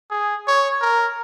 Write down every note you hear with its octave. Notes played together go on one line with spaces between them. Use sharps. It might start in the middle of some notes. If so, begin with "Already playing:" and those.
G#4
C#5
A#4